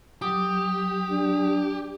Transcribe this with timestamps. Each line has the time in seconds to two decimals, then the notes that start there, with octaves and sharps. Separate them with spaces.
0.22 F#3 G4 D#6
1.11 D4